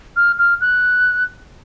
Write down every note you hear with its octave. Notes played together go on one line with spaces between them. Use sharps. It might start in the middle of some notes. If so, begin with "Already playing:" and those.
F6
F6
F#6